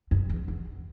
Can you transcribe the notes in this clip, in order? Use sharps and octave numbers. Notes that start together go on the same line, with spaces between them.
F#2
E2
E2